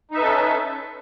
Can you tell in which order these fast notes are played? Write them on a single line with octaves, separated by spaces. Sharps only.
D#4 E5 B4 A4 C#4